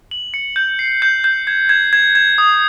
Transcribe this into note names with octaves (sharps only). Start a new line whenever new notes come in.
F#7
C#7
G6
C7
G6
G6
G#6
G#6
G#6
G#6
D#6